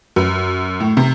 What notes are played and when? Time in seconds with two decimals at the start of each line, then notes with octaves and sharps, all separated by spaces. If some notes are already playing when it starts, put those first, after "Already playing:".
0.16 F#2
0.80 A2
0.97 C3